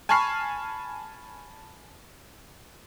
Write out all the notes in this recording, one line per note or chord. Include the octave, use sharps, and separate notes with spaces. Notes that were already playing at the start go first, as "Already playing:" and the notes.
G#5 A5 B5 C#6 F6 C7